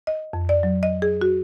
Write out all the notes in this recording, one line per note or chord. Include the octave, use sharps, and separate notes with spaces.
D#5
F2
D5
F#3
D#5
G#4
F#4